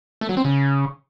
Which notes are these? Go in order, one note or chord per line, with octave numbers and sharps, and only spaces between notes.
A3
F#3
C4
C#3